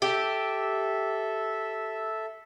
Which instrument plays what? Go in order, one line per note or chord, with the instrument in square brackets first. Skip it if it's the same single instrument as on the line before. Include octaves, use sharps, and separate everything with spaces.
[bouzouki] G4 [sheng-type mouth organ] A4 E5